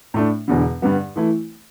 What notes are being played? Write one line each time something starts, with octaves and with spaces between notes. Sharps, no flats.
A2 A3 D4
E1 E2 D3
G2 D3 G3 B3
E3 A3 E4